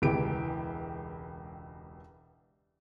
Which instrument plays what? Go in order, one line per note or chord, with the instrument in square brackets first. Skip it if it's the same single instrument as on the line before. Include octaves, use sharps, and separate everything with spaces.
[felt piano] E1 C#2 E3 G4 D7